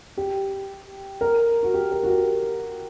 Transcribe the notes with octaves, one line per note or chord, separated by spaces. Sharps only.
G4
A#4
F#4
G4
A#4
F#4
G4